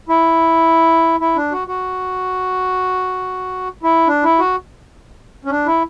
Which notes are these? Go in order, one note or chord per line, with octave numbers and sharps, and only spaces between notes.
E4
E4
D4
F#4
F#4
E4
D4
E4
F#4
C#4
D4
E4